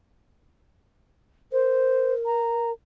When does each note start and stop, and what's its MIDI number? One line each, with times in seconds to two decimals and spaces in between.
1.52 2.72 70
1.52 2.14 72
2.26 2.70 82